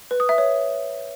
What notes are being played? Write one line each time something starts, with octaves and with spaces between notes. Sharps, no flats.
B4
D#6
E5
C#5